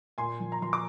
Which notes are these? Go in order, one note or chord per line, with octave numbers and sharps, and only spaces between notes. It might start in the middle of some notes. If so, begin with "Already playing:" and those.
A#2 G#5 C6
F3
A#5
F3 C6
D6